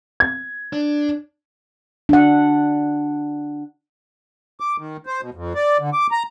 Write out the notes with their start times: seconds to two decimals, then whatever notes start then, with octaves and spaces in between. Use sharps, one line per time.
0.20 G#6
0.73 D4
2.09 D4 F#5
4.60 D6
4.78 D#3
5.06 C5
5.21 B2
5.34 F2
5.55 D5
5.79 D3
5.93 D6
6.12 A#5